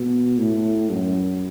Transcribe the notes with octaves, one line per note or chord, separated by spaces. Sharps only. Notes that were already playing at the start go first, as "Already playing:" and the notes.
Already playing: B2
A2
F#2